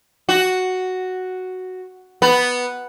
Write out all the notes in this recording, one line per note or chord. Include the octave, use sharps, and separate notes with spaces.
F#4
B3